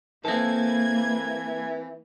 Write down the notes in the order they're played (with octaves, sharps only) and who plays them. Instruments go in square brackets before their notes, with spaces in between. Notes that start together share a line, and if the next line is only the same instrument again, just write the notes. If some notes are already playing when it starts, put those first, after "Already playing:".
[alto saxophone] E3 [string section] A#3 B4 G#6 [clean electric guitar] C4 A4